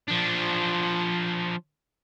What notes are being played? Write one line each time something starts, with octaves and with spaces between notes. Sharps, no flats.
F3 D4